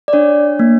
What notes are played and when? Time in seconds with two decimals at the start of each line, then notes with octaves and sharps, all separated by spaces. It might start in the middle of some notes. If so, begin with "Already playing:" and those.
0.08 D5
0.13 D4 C#5
0.59 A#3